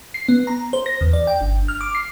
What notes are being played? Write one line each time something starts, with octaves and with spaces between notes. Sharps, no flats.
C7
B3
A#5
C5
A#6
E2
D5
G5
G1
F6
D6
C7